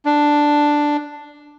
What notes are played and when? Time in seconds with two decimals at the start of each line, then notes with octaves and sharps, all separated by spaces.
0.05 D4